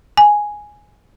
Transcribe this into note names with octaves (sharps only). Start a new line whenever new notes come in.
G#5